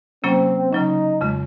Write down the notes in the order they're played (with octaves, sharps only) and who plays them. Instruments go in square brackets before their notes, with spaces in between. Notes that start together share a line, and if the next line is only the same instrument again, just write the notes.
[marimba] C3 F#3 A#3 C#4 [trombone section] C4
[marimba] C#3 F#3 C#4 [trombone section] D#4
[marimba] F2 C#3 G#3